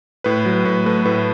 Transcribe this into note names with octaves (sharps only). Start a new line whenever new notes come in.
A2 B4
F#3
A2 B4
A3 B4
A2 B4